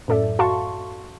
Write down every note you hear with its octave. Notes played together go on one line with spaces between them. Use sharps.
F#2 A2 A4 D5 E5
F#4 F5 A5 C6 C#6